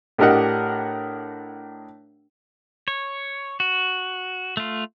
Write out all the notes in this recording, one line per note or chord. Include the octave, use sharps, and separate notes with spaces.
A2 D4 G4 A#4 D#5 F#5
C#5
F#4
A3 F4